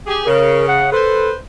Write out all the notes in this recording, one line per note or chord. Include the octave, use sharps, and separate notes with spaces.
G4 G#4
C#3 A#4
F#5
A4 B4 C5